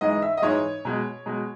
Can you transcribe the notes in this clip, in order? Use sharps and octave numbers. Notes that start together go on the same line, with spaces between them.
G#2 E3 G#3 D#5
E5
D#5
G#2 E3 G#3 C#5
B2 G#3
B2 G#3